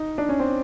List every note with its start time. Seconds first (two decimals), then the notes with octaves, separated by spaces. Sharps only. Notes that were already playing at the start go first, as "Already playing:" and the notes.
Already playing: D#4
0.18 D4
0.29 C#4
0.40 C4